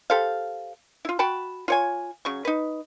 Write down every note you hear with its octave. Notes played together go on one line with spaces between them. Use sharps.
G4 A4 C5 F5
E4 F4
F#4 G5 A5 B5
F4 C#5 G#5
C#3 F#3 C#6
D#4 B4